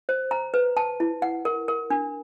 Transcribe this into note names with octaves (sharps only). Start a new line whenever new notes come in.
C5
A#5
B4
A5
E4
F#5
A#4
A#4
D4